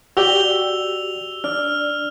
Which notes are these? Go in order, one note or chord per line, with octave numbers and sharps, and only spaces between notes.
F#4 G4 D5 E6 F7 G7
D4 D5 F6